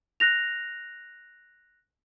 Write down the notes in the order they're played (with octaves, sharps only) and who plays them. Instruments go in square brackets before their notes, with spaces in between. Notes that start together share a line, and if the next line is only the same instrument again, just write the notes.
[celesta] F#6 A#6 F7